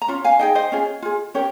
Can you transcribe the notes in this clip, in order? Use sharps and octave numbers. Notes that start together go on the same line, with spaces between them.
A#5
C#4 F4
F5 G#5
D#4 G#4 D#5 G5
C5 D#5
C#4 F4 G#4
F4 G#4
C#4 G4 A#4 C#5